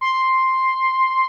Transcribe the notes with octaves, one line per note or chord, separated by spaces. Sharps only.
C6